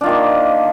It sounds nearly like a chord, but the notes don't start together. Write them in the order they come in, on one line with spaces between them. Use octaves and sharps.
D4 F4 D#3 A#3